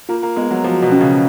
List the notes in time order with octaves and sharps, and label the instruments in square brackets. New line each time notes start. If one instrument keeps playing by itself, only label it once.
[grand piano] A#3 [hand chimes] F4
[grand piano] A#3
[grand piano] G#3 [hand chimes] B3
[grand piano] F#3
[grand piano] F3 [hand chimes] F#4
[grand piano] B2
[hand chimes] C#4
[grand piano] C#3